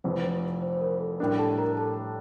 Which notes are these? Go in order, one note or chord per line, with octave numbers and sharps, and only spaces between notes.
F1 F2 E3 C5
C5
C5
A#4
A4
A2 G3 D4 A#4
A4 A5
A#4 A#5
A4 A5